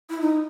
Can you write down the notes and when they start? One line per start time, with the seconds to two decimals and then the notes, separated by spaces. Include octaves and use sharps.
0.10 E4
0.21 D#4